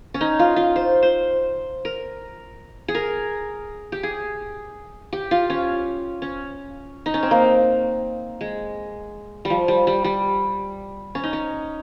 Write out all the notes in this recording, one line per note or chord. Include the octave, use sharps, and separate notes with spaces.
C#4
D#4
F4
F4
C5
C5
A#4
G#4
A#4
G4
G#4
G4
F4
C#4
C#4
D#4
C#4
C4
A#3
G#3
G3
F3
G3
G3
G3
C#4
D#4
C#4